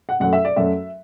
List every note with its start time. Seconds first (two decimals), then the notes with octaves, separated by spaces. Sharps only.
0.09 F#5
0.20 F#2 F#3 A3 F#5
0.33 E5
0.45 D5
0.56 F#2 F#3 A3 E5